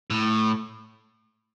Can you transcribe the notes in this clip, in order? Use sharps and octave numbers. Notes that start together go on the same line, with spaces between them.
A2